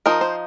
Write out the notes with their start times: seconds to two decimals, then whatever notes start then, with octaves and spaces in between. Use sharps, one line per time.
0.06 F3 D#4 A#4
0.21 C5